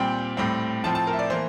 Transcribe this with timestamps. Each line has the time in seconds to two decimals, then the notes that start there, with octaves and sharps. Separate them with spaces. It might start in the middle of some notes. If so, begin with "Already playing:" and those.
Already playing: A#2 G3 C4 G5
0.37 A2 G3 C4
0.84 A2 F3 C4 A5
0.95 A5
1.07 A#4
1.13 E5
1.19 D5
1.30 E3 A#3 C5